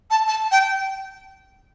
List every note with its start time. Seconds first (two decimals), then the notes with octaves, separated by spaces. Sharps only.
0.11 A5
0.28 A5
0.52 G5